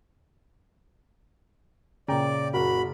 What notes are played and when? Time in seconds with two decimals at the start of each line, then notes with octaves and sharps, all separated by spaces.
2.08 A#2 C#3 D5 G5 A#5
2.54 F#1 F#4 A#4 B5